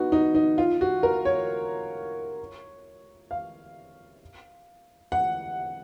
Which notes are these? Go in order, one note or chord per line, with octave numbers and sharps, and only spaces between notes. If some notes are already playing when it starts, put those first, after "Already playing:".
Already playing: B3 D#4 F#4
D#4
D#4
F4
F#4
A#4
C#5
F5
F#5